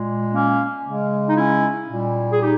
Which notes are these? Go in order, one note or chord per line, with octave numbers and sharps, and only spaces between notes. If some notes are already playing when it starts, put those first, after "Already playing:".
Already playing: A#2 G#3
A#3 C#4
C#3 G#3
D#4
C#4 E4
A#2 G3
G#4
D#4 G4